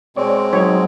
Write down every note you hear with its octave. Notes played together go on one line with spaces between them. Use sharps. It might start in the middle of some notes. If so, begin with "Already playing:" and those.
B2 G#3 C4 C#5 D5
F#3 D#4 C#5